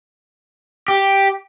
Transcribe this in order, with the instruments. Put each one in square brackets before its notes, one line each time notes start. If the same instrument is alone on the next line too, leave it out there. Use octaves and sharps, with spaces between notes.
[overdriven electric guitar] G4